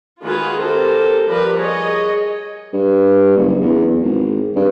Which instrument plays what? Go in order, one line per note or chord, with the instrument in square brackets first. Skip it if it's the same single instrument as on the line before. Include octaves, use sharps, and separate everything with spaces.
[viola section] D#3 G#3 F4 F#4 G#4 B4
C4 G4 A4 A#4 C5
F3 G3 G4 A#4 B4 D5
G#4 C#5 D#5
[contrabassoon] G2
F#1
E2
G#1
G2